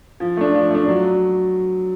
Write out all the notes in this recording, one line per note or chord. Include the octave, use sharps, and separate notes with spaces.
F3
A3 D4
F3
A3 D4
F#3